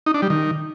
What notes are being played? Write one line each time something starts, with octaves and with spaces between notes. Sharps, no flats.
D#4
D4
G3
D#3